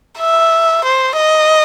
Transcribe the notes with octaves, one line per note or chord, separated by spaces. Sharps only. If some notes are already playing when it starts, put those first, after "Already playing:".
E5
C5
D#5